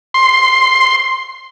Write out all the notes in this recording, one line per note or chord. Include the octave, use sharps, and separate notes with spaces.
C6